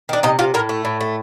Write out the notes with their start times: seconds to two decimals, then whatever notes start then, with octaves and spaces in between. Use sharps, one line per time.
0.09 D#3 D4
0.23 C3 D#4
0.39 C3 F4
0.54 A2 A#4
0.69 A3
0.85 A2
1.01 A3